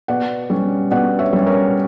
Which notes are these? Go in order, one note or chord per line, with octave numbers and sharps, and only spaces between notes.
B2 D5 F#5
G3 C#4
B2 D5 F#5
C#5 E5
G3 C#4
A#4 C#5